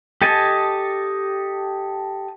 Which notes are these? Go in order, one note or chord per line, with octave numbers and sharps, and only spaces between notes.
G4 A4 D#5 G#5 A5